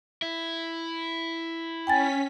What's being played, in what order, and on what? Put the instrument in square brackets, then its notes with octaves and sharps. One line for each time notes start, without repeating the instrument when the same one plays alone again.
[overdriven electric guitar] E4
[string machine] C#4 B6 [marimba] G5 G#5 A6